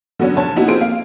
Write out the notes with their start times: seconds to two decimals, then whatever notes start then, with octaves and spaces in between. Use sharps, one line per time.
0.19 D3 F#3 B3 C#4 D4
0.36 F1 C#5 A5
0.56 A#3 B3 D#4 E4 F#4 G4
0.67 C4 F4 G#4 A4 C5 D7
0.80 A#3 F5